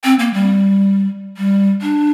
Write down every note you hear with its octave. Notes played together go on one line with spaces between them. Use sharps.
C4
A#3
G3
G3
D4